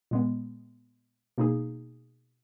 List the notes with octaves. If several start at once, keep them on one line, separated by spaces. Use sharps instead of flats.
A#2 G#3 B3
B2 A#3 D#4 G#4